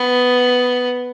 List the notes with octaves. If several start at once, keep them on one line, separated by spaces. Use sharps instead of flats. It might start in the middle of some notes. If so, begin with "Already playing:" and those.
Already playing: B3